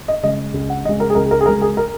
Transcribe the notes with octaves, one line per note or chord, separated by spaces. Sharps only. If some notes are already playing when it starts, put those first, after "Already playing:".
D#5
C#3 G#3 D#5
C#2
F#5
C#3 G#3 D#5
A#4
G#4
C#2 A#4
G#4
A#4
G#4
C#3 G#3 A#4
G#4
A#4